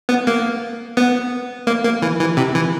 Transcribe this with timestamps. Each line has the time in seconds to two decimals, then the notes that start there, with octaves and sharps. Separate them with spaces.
0.09 B3
0.27 A#3
0.97 B3
1.67 A#3
1.84 A#3
2.02 E3
2.20 E3
2.37 C3
2.55 E3